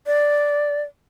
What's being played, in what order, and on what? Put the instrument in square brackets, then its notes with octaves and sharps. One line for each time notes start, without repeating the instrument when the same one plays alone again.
[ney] D5